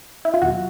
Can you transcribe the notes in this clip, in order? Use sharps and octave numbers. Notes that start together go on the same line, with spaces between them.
E4
F4
E2 B2 F#3 F#4